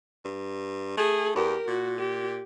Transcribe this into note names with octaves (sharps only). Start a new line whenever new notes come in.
G2
A3 G#4
E2 G4 A#4
A#2 F#4
G4